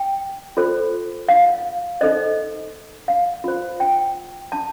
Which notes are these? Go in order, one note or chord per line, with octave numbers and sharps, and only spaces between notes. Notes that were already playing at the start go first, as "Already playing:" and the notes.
Already playing: G5
F4 A4 C5
F5
D#4 A4 C5 D#5
F5
F4 C5
G5
A5